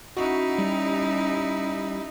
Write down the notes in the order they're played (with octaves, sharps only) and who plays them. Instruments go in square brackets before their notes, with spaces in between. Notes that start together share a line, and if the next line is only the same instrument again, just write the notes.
[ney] C#4 [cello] D#4 E4 [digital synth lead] F#4
[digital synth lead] G3